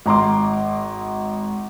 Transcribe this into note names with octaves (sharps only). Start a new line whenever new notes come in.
G#1 A#5 C6 D6